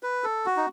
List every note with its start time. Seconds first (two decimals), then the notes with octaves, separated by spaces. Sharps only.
0.03 B4
0.24 A4
0.46 F#4
0.57 D#4